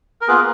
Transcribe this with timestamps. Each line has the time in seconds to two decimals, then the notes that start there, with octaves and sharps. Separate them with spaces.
0.21 A#4
0.28 A#3 B3 F4 G#4 B4